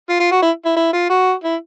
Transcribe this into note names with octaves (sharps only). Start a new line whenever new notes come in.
F4
F4
F#4
E4
E4
E4
F4
F#4
E4